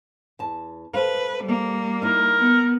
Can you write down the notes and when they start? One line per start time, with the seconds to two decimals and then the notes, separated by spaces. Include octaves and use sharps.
0.39 E2 A5
0.94 A4 B4 C5 F5
1.43 G3 A#3
2.02 D#4 E4 A#4
2.39 B3